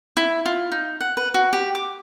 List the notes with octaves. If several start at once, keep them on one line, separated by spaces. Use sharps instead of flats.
E4
F4
D#4
F#5
B4
F#4
G4
D6